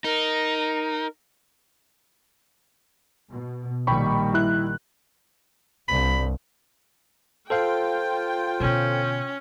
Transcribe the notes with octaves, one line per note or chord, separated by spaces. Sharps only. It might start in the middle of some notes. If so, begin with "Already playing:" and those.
D#4 A#4
B2
A#1 D#3 G3 G5 B5 C#6
E4 F#6
C2 G2 B5
F4 A4 C5 F5 G5
B2 D3 C#4